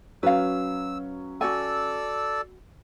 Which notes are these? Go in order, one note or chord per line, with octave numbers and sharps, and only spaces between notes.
F#3 C#4 B4 F5 E6
F#4 A4 D5 G#5 E6